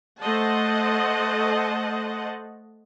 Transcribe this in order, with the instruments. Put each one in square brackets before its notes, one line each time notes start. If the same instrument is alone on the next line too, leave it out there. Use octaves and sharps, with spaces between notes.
[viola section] A3 C5 D#5 F#5 A5